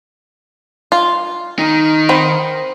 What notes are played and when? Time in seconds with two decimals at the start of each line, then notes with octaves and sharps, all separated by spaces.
0.92 F4
1.59 D#3 D#4
2.09 C4 B5